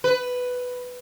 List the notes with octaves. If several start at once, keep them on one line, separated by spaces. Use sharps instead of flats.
B4